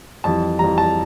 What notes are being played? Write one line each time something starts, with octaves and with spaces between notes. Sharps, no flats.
F2 E3 G3 A5
F2 E3 G3 A#5
A5